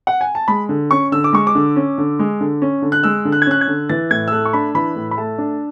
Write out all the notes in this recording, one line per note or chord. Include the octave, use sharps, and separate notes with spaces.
F#5
G#5
A5
G#3 B5
D3
C#4 C#6
D3 E6
D6
G#3 C#6
D6
D3
C#4
D3
G#3
D3
C#4
D3
F#6
G#3 E6
D3
F#6
G#6
C#4 F#6
G#6
D3
E3 A6
A2 G#6
E6
A3 F#6
C#6
D4 B5
E3 B5
A2
B5
A3 A5
D4